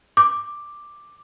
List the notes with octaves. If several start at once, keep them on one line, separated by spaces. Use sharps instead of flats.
D6